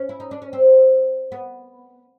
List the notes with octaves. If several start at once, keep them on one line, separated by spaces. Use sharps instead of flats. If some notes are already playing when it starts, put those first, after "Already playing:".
Already playing: C#4
E4
D#4
D4
C#4
C4
B3